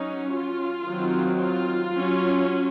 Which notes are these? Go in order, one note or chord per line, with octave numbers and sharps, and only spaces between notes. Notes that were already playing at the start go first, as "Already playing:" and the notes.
Already playing: F#3 C#4 D#4
F4
D#3 F#3 C4
F4
F#3 C#4